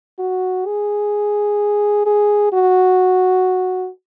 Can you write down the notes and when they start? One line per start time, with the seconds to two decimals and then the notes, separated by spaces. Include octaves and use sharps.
0.19 F#4
0.66 G#4
2.06 G#4
2.53 F#4